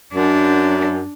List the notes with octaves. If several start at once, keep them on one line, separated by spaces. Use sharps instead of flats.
F#2 D4